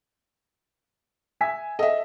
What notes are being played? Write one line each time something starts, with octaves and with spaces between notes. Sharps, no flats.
E5 G#5 B6
A4 D#5 E5